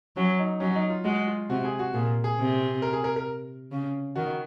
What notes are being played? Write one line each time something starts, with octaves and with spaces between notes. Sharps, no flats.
F#3 C#4
D#4
F#3 C#4
D#4
F4
G#3 F#4
F4
C3 F#4
G#4
F#4
A#2 G#4
G#4
C3
A#4
G#4
A#4
A#4
C#3
D#3 F#4